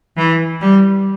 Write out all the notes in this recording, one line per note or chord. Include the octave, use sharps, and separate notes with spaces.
E3
G3